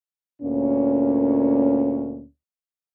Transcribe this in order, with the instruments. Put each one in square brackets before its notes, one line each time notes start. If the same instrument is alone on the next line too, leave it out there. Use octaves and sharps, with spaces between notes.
[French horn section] D2 A#2 A#3 C#4